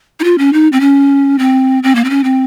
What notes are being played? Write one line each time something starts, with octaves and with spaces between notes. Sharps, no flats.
D#4
F4
C#4
D#4
C4
C#4
C4
C4
A#3
C4
C#4
C4